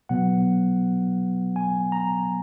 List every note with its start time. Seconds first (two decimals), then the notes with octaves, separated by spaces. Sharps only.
0.09 B2 F#3 B3 F#5
1.56 G#5
1.92 A#5